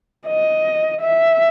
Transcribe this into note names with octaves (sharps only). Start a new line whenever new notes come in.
D#5
E5